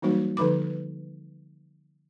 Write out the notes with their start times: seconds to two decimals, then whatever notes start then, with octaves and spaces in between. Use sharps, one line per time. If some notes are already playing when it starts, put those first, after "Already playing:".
0.02 E3 F#3 G3 A#3 D#4 F#4
0.37 D3 F3 D#4 B4 B5 D6